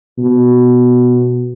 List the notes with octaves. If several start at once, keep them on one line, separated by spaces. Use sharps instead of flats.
B2